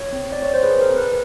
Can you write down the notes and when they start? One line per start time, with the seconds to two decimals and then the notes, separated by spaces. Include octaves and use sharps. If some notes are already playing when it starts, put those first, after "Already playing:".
Already playing: C#5
0.12 C4
0.32 D5
0.38 C4
0.43 C#5
0.54 C5
0.63 G#4 B4
0.81 A#4
0.90 C4
0.98 B4